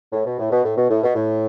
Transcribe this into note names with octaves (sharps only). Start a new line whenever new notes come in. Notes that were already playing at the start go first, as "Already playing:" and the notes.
A2
B2
A2
B2
A2
B2
A2
B2
A2